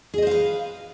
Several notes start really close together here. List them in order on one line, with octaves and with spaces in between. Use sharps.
G#4 D#5 C5 F5 B4